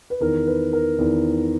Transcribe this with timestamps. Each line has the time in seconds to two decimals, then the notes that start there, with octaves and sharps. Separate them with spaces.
0.10 B4
0.20 E2 D#3 A#4
0.47 B4
0.73 A#4
0.98 E2 D#3